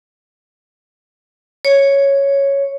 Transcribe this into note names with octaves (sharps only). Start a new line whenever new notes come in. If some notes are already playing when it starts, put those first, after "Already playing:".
C#5